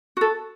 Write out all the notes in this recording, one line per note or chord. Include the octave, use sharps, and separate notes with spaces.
F#4 A4